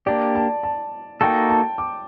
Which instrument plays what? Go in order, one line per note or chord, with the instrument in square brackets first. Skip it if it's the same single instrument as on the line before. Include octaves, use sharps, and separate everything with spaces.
[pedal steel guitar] A#3 D4 G4 [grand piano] D5
[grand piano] A5
A5
[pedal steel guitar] A#3 D#4 F#4 A4 [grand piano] G5
[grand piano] A5
D6